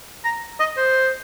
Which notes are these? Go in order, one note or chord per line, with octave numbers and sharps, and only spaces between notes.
A#5
D#5
C5